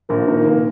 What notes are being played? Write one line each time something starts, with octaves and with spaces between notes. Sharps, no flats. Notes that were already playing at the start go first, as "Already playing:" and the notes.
A#1 A#3 A#4
D#3 A#3 A#4
F1 A#3 A#4